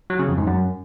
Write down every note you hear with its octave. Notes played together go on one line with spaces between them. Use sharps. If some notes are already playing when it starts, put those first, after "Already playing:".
F#3
C#3
F2
G#2
F#2